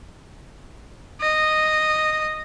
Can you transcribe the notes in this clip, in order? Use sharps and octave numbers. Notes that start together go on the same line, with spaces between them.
D#5